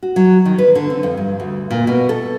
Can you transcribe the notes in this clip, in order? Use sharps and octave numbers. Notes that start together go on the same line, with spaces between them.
F#4
F#3
D#3
B4
D3
C4
F2
G2
D2
A#2
B2
A4